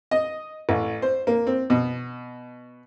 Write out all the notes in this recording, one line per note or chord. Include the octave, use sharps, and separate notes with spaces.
D#5
A1
C5
A#3
C4
B2